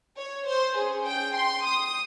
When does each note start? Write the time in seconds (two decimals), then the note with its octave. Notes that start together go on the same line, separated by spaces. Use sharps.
0.17 C#5
0.47 C5
0.77 C#4 G#4
1.07 G5
1.36 C6
1.66 D#6